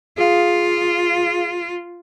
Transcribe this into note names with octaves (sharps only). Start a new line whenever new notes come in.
F4 G#4 F5